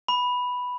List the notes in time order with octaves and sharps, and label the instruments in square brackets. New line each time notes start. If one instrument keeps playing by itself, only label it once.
[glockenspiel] B5